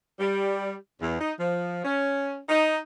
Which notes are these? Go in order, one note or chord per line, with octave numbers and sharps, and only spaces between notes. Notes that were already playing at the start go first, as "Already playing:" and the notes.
G3
E2
D#4
F3
C#4
D#4